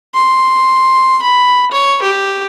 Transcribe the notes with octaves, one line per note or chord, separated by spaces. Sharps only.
C6
B5
C#5
G4